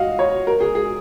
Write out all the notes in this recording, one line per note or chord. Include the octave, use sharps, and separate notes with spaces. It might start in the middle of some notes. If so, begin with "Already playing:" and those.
Already playing: F#4 D#5 F5
C#5
A#4
G#4
G#4